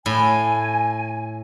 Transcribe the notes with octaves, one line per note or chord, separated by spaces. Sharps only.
A2 G#5